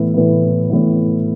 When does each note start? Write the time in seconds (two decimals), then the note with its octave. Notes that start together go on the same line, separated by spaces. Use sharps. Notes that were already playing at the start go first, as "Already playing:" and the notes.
Already playing: A2 E3 B3 E4
0.14 A2 E3 B3 E4
0.70 A2 E3 B3 E4